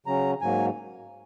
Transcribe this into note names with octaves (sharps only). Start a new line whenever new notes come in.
C#3 F#3 C#4 A#5
G#2 F#3 A#3 G#5